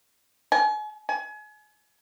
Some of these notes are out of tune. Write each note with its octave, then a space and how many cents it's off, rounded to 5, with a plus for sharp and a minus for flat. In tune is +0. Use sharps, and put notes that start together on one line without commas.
G#5 +40
G#5 +35